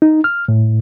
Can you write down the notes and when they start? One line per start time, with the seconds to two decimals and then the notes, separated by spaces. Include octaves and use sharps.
0.02 D#4
0.24 F6
0.48 A2